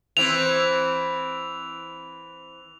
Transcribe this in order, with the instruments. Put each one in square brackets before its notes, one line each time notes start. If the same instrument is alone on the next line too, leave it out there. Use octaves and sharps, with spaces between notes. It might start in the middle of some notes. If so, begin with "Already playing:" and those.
[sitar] E3 C4 [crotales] F7